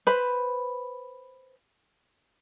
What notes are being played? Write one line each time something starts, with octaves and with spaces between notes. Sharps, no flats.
B4 C5 B5